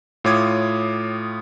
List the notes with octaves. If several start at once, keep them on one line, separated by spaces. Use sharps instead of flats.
A2 F4 C#5 D6 D#6 G#6